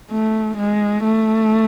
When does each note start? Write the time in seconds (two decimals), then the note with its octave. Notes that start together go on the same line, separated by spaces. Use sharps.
0.11 A3
0.58 G#3
1.04 A3